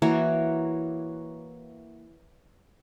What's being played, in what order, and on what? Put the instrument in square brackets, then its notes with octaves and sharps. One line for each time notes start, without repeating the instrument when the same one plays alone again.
[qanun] E3 A#3 F#4 C#5